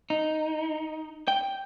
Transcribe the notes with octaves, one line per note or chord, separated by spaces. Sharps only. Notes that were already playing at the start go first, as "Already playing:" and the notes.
D#4
G5